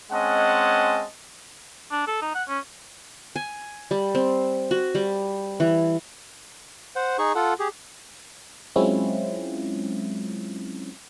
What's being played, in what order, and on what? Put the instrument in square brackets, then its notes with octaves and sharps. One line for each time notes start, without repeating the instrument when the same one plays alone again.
[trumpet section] G#3 C4 C#4 D#5 F#5 A5
[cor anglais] D4
A4
D#4
F#5
C#4
[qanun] G#5
G3
C4
F#4
G3
E3
[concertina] C5 F#5
D#4 G#4 C#6
F4 A4 F#5
G4 G#4
[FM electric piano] F#3 G#3 C4 C#4 E4 F4